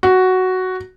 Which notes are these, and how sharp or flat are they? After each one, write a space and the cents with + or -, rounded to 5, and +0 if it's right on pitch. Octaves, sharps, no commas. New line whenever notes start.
F#4 +5